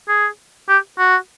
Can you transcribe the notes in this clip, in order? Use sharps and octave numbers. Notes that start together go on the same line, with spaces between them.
G#4
G4
F#4